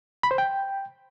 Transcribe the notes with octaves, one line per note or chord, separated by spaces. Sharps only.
B5
C5
G5